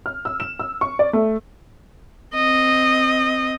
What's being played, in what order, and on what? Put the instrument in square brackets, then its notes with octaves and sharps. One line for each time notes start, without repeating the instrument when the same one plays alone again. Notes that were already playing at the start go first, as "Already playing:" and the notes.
[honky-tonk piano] F6
E6
E7
E6
C#6
D5
A3
[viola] C4 D#5